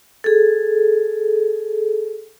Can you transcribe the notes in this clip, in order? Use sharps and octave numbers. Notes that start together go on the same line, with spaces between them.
G#4 A4